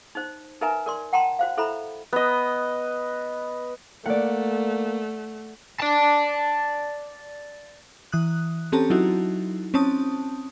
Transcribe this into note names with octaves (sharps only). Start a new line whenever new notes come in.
D#4 C5
D#4 A#4 B4 E5 G#5 A#5
A#4 D5 C6
F#5 G5 A5 A#5 C6
F#4 C5 F5
E4 A4 C5 E5 A#5 B5
B3 D#5
A3 A#3 D5 F#5
D5 A5
E3 D#6 F#6
C4 C#4 G4 A4 A5 A#5
F#3 D#4 E4 F#4
C4 C#4 A5 D#6